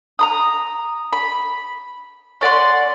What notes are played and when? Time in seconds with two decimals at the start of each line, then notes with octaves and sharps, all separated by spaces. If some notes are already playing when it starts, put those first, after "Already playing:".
0.19 A#5 B5 D#6
1.13 B5
2.41 C#4 D5 F#5 C6